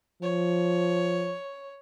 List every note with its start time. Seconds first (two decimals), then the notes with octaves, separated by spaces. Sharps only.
0.23 F3 C#5